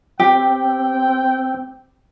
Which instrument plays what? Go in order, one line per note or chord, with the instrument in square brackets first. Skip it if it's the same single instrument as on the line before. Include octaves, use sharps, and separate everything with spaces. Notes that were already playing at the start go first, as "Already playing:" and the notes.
[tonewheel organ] C4 [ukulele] G4 [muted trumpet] G5